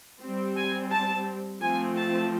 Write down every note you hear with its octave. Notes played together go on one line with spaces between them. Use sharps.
G3 C4
G#5
A5
F3 A3 C4 G#5
A5